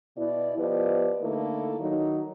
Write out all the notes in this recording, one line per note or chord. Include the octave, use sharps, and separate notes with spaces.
B2 E4 D5
F3 B3 G4 B4 D5 D#5
D3 A3 A#3 D#4 E4 A4
D#3 F#3 D#4